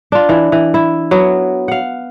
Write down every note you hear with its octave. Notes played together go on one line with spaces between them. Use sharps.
D4 F4
E3 E4
E3
E4
F#3 B3
F5 F#5